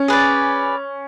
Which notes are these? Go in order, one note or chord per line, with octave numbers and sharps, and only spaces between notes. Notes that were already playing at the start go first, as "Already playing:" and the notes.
Already playing: C#4
G#4 B4 D5